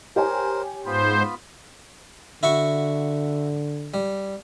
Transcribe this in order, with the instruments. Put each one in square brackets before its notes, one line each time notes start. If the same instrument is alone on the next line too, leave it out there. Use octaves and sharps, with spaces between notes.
[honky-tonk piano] G4 C#5 G#5 [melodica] A#4 C5
[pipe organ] G#2 C5 [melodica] B3 F4 B5
[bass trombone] D3 [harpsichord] E4 F#4 C#6
[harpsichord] G3